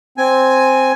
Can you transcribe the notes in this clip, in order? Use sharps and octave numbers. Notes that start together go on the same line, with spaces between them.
C4 G#5